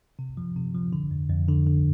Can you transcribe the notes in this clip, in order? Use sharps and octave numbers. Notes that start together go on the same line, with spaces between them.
C3
F3
C3
F3
D3
F2
F2
D3
D3